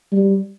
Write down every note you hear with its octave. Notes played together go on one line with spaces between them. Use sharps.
G3